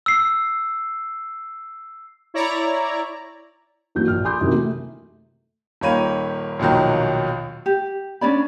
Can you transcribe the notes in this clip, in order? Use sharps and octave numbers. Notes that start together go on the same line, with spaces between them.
E6 C7
E4 C#5 D5 A#5
D#2 E3 F#3 G6
A#1 F6
G#5 B5 C6 D6 D#6 G6
F#2 C3 D#3 E3 F#3
A3
D#1 D#3 A#3 C#5 B5 D#7
A#1 D#2 B2 D#3 F#3
G4
C#4 D4 D5 B5